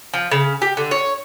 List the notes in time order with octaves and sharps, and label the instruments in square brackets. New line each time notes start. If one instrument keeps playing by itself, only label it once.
[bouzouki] F3
C#3
G4
D3
C#5